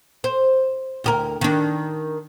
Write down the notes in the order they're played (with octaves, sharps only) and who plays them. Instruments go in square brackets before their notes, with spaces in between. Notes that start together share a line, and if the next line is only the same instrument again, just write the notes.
[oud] C5
D2 G4 A#4
D#3 D4